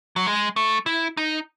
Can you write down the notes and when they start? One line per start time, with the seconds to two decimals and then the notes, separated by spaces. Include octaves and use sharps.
0.16 F#3
0.27 G#3
0.56 A3
0.86 E4
1.17 D#4